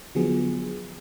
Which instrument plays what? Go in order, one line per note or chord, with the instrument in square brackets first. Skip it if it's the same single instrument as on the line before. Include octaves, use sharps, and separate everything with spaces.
[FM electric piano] D3 F3 F#3 B3 G#4